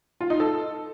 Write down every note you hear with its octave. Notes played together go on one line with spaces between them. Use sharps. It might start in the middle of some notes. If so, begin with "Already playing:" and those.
F4
D#4
A4